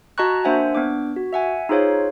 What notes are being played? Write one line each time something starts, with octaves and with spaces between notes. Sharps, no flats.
F#4 D#5 A5 A#5 C#6 F#6
A#3 D4 C5 E5 F#5 G#5
B3 D4 D6
F#4
E5 F#5 G#5
D#4 F4 G#4 C5 C#5 F5